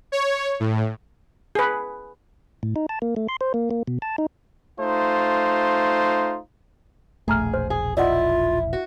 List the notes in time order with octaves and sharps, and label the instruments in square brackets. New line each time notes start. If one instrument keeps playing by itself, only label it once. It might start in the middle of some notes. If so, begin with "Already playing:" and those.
[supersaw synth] C#5
A2
[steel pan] G#4 B4
[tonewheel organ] A2
D#4
A5
A#3
A3
C6
C5
A#3
A#3
B2
A5
D#4
[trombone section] A3 D#4 F4 C5
[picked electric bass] E1 A#1 [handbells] A3 A#5 F6 [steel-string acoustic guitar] G#4
[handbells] C5 F6
[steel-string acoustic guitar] G#4
[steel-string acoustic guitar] E4 [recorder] F4 [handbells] D5 D#5 F#5
[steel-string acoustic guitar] F#4